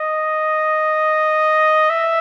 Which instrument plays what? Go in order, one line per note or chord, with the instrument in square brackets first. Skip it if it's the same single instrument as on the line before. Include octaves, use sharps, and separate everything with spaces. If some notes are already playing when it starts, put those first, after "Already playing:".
Already playing: [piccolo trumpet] D#5
E5